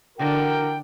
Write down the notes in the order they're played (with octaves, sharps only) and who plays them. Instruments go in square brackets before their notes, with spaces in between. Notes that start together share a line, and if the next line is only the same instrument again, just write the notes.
[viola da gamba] D3 D4 [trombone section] E3 F#4 A#4 [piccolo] G5